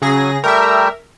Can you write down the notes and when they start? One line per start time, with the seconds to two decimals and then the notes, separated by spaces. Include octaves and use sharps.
0.02 C#3 F#3 G#4 A#6
0.44 G3 A3 A#4 E5 G5